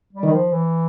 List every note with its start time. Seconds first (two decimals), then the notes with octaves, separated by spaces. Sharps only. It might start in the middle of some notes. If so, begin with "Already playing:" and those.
0.13 G3
0.23 D#3
0.32 F3
0.52 E3